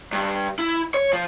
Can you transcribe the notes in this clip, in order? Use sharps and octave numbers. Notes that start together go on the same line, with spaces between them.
G2
E4
C#5
F3